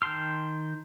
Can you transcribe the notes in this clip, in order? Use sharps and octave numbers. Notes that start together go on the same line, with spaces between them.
D#3 G5 A5 C6 F6